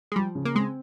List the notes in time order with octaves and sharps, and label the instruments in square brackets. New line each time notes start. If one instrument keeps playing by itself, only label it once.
[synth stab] G#3
[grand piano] F3 [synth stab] G3
[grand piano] C#3
[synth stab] A#3
[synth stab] G#3 [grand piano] C4